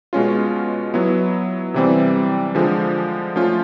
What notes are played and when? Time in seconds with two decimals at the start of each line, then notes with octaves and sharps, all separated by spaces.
0.13 B2 G#3 C#4 F4
0.94 F#3 B3 E4
1.74 C3 E3 G3 C4
2.55 D3 F3 G#3
3.36 F3 A3 C#4 F4